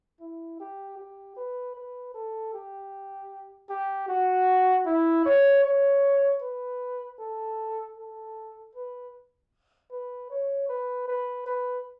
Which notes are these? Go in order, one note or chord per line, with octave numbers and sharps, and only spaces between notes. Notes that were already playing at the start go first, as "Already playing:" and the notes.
E4
G4
G4
B4
B4
A4
G4
G4
F#4
E4
C#5
C#5
B4
A4
A4
B4
B4
C#5
B4
B4
B4